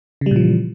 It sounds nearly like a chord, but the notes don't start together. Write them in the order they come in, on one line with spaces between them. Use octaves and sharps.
C#3 G3 A#2 F3 E3